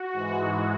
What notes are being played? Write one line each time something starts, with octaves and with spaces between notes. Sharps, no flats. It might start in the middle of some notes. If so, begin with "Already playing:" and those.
Already playing: F#4
G#2 E3 G#3